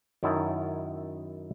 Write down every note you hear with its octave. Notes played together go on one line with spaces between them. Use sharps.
F#2 D#3 E4 A5